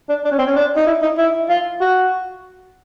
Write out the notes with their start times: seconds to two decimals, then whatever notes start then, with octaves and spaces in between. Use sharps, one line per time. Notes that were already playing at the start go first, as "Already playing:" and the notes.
0.09 D4
0.25 D4
0.32 C#4
0.38 C4
0.46 C#4
0.56 D4
0.76 D#4
0.87 E4
1.02 D#4
1.18 E4
1.49 F4
1.81 F#4